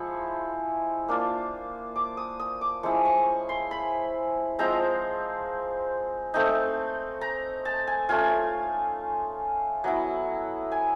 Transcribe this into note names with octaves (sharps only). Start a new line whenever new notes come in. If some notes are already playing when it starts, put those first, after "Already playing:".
Already playing: F3 G#3 E4 C#6
A#3 D4 F4
D6
D#6
D#6
D6
F3 G#3 C#4 E4 C#6
C#6
C6
B5
F3 G#3 C4 A#5
A3 C4 D#4
A#5
A5
G#5
A3 C#4 F4 G#5
F#3 B3 E4
G#5